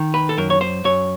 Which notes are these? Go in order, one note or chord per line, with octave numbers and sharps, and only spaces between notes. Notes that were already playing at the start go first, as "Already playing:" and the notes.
Already playing: D#3
B4
A4
F#2 A#4
C#5
C5
F#2 C#5